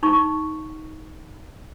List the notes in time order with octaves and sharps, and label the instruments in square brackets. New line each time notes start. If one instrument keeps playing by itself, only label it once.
[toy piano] D#4 C#6